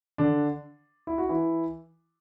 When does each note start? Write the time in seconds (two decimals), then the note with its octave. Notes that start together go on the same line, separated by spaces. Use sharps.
0.18 D3 D4
1.07 E4
1.18 F#4
1.29 E3 E4